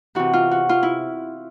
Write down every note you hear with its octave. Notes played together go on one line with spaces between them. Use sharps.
C3 E3 F#4
F4
F#4
F4
E4